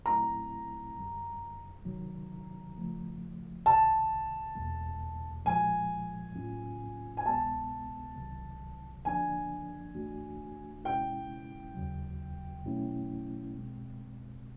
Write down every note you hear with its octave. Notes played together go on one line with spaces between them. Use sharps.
A#2 F#3 A3 C4 E4 A#5
F#2 D3 G3
C3 D#3 F#3
C#3 F3 A3
C2 C3 D#3 A5
E2 B2 G3 A#3
A#2 F3 G#3 G#5
A2 F#3 A#3 C#4 F4
G#5
C2 B2 G#3 B3 A5
C2 C3 D#3 F#3
D3 F3 A#3 D4 G#5
G2 E3 A3 D4 F#4
B2 G#3 C#4 E4 G5
D#2 C#3 F#3
B2 F#3 A3 C#4 E4
B2 G#3 C4